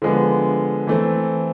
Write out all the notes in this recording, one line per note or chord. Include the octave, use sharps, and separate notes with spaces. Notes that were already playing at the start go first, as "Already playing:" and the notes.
D3 F3 G#3 B3
E3 A3 C4